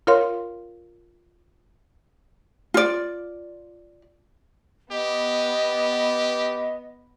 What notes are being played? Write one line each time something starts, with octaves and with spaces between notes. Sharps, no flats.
F4 A#4 C#5 F5 C6
F4 D5
B3 G4 D#5